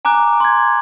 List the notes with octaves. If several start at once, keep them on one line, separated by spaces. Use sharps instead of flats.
G#5 A#5 D6 F#6
C6 G#6